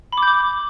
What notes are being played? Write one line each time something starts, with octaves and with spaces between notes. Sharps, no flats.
B5
D6
G6
D6